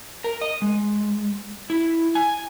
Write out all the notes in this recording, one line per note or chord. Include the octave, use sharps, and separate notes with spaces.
A#4
D#5
G#3
E4
G#5